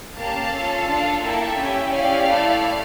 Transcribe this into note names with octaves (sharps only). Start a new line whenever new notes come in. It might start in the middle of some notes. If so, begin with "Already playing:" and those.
A#3 C#4 G4 F5 A5
C#4 F4 A4
D4 F4 A4
A#3 E4 A4 E5 G5
C#4 E4 G4
C#4 E4 G4 D5 F5
A3 E4 A4